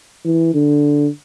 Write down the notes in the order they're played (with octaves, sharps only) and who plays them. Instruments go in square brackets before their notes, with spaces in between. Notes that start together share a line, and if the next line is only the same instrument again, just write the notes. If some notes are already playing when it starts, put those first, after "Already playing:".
[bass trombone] E3
D3